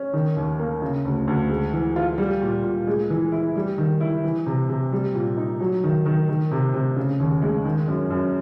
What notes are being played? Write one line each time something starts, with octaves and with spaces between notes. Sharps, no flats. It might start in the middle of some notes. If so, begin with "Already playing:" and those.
Already playing: C#4
D#3
D#2
A#3
C#3
D2
D2
G#3
E3
F4
G3
A#2
A#2
G#3
E3
E4
G3
D#3
E4
E3
C3
C3
G3
A#2
D#4
F#3
D#3
D#3
D#3
C3
C3
C#3
D#2
G#3
D#3
F#2
F#2